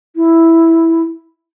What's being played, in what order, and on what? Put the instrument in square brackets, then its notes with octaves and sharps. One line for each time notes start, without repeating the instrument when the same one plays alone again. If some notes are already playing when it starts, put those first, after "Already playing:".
[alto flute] E4